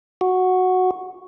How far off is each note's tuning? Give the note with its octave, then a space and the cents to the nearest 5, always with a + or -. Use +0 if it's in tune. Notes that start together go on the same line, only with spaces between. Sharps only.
F#4 -5